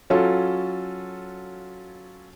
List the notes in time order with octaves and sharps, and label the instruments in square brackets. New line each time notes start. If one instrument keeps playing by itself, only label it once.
[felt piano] F#3 C#4 F4 F#4 A4